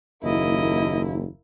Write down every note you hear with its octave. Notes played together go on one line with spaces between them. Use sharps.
F#1 D#2 A#3 E4 D#5